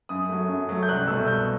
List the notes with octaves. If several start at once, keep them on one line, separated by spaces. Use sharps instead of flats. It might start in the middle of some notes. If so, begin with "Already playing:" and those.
F#2 D#6
F#3 A3
F#2
F#3 A3
G6
C2 F#6
B2 A3 E6
C2 G6